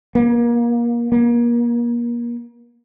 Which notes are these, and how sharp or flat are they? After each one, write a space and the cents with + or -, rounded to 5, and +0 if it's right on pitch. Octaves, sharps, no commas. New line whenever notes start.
A#3 +30
A#3 +35